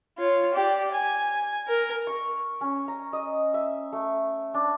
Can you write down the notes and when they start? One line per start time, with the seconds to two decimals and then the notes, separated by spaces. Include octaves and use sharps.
0.18 F4 C#5
0.54 G4 D5
0.92 G#5
1.68 A#4
2.07 C#6
2.61 C#4
2.88 A#5
3.13 D#5
3.54 E5
3.93 A3
4.54 D4